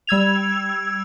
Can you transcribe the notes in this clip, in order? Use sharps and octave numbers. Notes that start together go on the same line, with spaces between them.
G3 E6 G#6 F7